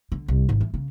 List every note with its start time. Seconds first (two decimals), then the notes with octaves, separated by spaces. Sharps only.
0.12 D3
0.28 C2
0.49 G#1
0.61 E3
0.74 C#3